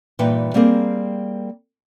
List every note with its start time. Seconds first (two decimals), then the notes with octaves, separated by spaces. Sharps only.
0.19 G2 A#2 E3 D#4 B4 G5
0.54 G3 A#3 C4 G#4 A#4